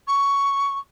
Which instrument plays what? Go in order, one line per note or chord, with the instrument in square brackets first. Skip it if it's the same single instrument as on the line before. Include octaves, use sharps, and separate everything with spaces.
[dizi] C#6